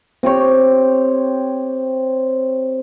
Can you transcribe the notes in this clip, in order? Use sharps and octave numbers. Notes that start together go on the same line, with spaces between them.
C4 G4 C#5